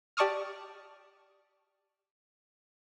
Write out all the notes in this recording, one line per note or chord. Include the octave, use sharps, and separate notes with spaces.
G4 D5 A5 C#6 D#6 F6